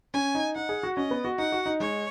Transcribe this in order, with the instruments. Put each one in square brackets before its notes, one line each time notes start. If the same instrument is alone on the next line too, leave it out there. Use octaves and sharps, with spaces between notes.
[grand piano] C#4 [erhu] G#5
[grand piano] D#4
[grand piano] D#4 [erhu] F#5
[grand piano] G#4
F#4
[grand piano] C#4 [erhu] D#5
[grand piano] B3
F#4
[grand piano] D#4 [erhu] F#5
[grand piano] F#4
D#4
[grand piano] G#3 [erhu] C#5